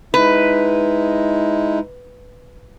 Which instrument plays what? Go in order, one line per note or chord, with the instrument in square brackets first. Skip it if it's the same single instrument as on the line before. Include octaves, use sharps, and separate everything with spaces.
[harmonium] G#3 D#4 E4 [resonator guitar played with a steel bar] B4